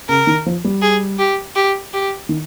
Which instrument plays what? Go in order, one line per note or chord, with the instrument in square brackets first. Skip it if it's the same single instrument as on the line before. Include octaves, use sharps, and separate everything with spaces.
[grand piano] C#3 [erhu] A#4
[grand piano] D#3
F3
G3
[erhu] G#4
G4
G4
G4
[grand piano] D#3